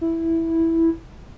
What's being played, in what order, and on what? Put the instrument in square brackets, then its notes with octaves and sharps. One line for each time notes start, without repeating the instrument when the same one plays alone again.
[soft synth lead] E4